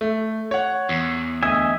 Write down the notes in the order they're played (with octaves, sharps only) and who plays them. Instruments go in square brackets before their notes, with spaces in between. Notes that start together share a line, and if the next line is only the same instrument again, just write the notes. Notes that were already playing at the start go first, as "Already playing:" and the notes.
[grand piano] A3
C#5 F#5
[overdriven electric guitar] E2
[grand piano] D2 D#6 [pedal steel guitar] D#5 E5 G#5